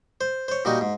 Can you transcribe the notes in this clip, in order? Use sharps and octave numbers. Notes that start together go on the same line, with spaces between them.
C5
C5 C#5
A#2 G3 D#4 F#4
G#2